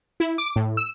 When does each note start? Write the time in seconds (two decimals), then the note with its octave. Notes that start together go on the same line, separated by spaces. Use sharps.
0.20 E4
0.38 D6
0.56 A2
0.77 E6